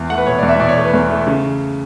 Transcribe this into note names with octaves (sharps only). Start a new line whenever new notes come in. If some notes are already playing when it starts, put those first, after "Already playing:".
Already playing: E2
A3 F#5
B4
B2 C#5
D5
E2
E5
B2 D5
C#5
A3
B4
E2
A3
C#3